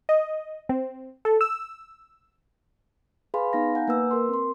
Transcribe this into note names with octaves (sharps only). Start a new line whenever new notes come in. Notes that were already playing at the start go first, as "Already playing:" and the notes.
D#5
C4
A4
E6
G#4 B4 F5 G#5 B5 C6
B3 D#4 F5 A#6
F#5 G#5 A#5 G6
A#3 B4 E6
A#4 C6
C4 C6